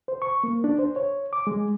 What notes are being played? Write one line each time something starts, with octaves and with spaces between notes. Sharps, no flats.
C5
C#6
A#3
D4
C5
C#5
D6
G#3